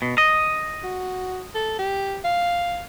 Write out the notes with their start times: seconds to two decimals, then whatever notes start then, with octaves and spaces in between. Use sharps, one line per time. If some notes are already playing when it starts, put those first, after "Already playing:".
0.02 B2
0.18 D#5
0.84 F#4
1.55 A4
1.79 G4
2.24 F5